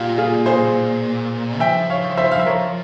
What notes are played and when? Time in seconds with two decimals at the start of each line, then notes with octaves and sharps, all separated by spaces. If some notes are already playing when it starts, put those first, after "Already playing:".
Already playing: A#2 F4 G4
0.18 F4 G#4
0.46 G#4 C5
1.60 F3 E5 G5
1.90 C#5 F5
2.17 C5 E5
2.32 F5
2.40 E5
2.46 A#4 C#5